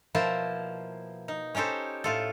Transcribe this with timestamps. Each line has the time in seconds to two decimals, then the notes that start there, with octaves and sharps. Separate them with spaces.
0.15 B2 F3 A#3 E4 C5 A5
1.28 D#4
1.55 C#4 D#4 G4 A4 C5
2.04 A2 F4 A4